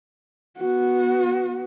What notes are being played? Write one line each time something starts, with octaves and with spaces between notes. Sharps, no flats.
B3 F#4